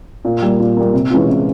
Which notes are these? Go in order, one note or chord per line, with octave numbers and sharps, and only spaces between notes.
A#2
G3 A#3
A#2
G3 A#3
C3
E3 G#3 C#4 F4
C3